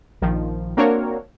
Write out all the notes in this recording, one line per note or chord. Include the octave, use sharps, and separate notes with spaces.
A#1 D#3 F3
A#3 C4 D4 F#4 A#4 C#5